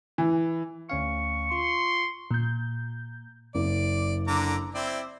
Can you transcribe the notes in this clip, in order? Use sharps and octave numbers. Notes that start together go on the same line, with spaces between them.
E3
D2 C#4 F5 C#6
F4 C6
A#2 G6
F#1 D5
D3 A#5 D6
C4 E4 D5